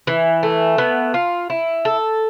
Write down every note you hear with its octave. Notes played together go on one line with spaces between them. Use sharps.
E3
A3
B3
F4
E4
A4